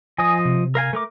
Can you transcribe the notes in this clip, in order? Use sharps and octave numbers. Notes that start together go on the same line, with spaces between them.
F3 D#5 G#5 D#6
C3
A#4 F5 G#5
A3 A#4 D6